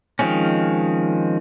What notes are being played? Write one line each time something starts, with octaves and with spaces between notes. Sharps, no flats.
D#3 F3 G#3 C4 C#4